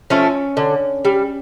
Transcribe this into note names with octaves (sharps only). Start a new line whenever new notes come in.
F3 A3 C#4
D3
G3